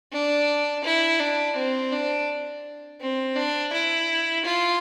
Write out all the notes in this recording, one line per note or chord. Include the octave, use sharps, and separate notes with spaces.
D4
E4
D4
C4
D4
C4
D4
E4
F4